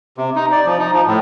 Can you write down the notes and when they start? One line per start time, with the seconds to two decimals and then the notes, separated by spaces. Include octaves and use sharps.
0.18 C3
0.36 D#4
0.52 D5
0.66 F3
0.79 D#4
0.92 F3
1.06 A2